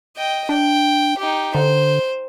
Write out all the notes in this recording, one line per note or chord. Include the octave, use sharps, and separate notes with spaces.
D#5 G5
D4 G5
D#4 G4
D3 C5